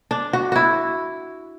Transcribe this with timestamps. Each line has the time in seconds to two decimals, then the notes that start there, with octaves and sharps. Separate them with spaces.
0.11 D4
0.33 F#4
0.52 E4 F#4